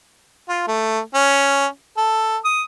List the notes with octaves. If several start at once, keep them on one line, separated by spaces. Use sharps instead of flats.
F4
A3
C#4
A4
D#6